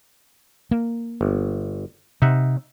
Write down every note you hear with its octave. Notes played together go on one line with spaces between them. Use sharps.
A#3
G1
C3 D#4 E5 F#5